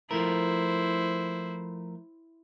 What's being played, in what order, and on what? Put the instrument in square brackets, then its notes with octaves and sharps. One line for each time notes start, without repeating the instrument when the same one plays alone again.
[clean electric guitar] F3 A3 A#4 [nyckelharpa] E4 C5